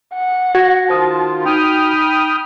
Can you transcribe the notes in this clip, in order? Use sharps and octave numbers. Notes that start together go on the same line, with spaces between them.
F#5
F#4 G#6 A#6
D#3 F4 C5 A5 D#6
D#4 G5 B5 D#6 F6